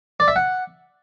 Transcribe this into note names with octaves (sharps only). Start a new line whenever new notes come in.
D5
E5
F#5